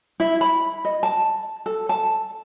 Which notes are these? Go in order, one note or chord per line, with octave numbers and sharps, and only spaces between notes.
E4
B5
D#5
A5
A4
A5